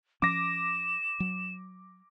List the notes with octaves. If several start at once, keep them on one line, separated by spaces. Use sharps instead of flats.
F3 C#4 D6 A#6 E7
F#3